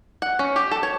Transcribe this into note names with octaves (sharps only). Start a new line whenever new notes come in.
F#5
C#4
G4
A4
C#5